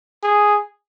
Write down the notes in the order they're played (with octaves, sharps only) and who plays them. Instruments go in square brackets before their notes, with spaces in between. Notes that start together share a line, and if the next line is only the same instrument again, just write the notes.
[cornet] G#4